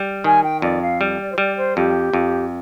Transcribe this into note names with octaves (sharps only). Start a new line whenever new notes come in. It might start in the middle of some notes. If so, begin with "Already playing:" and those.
Already playing: G3
D#3 G#5
G5
F2 D5
F5
G3
D5
C5
G3 D5
C5
F2 G4
F2